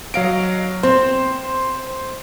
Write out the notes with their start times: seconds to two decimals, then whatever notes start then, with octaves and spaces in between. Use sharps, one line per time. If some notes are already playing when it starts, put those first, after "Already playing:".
0.14 F#3 D#5 F5 D7
0.83 C4 C5